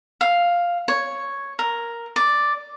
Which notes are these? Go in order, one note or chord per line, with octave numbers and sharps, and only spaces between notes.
F5
C#5
A#4
D5